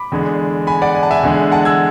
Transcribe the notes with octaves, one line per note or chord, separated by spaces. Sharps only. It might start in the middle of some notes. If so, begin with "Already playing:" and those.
Already playing: B5 D6
E2 D3 G#3
G#5 B5
D5 F#5
G#5
A5
E5 G#5
E2 D3 G#3
F#5 A5
E6 G#6